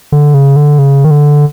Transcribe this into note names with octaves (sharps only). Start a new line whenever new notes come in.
D3
C#3
D3
C#3
D#3
D3